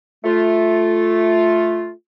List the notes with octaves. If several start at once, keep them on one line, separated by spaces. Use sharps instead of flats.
A3 F4